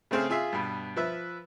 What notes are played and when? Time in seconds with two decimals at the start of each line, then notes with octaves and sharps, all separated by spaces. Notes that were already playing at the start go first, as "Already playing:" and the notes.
0.11 C#3 A3 C4 G#4 F6
0.30 F4 G#4 E5 F5
0.52 G2 B2
0.96 F3 B4 E5